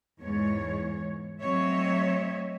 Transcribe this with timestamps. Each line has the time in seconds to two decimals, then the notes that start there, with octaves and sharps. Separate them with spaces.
0.21 E2 G#2 G#3 C#5
1.42 F#3 A3 C4 C#5 D#5 E5